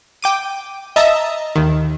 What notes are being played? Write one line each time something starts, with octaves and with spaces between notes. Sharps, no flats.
G5 D6 D#7
D#5 E5 A5 A#5
D#2 D#3